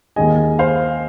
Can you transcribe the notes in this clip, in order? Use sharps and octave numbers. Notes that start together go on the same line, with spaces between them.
D#2 D#3 G#3 D#5 G#5
C5 F5